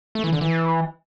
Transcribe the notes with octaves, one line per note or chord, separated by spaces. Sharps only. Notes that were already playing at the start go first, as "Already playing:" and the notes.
A3
E3
D3
E3